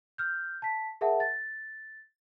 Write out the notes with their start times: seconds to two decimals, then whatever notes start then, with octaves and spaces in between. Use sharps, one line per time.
0.18 F6 G6
0.62 A5 B6
1.01 G#4 A#4 E5 F#5 A5
1.20 A6